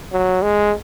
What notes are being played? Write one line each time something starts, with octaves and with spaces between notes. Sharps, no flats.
F#3
G#3